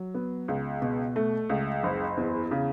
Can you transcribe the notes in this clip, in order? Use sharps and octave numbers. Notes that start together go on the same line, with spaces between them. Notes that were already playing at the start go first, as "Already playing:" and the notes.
Already playing: F#3
B3
C#2
B2
A3
C#2
F#1
E2
C#3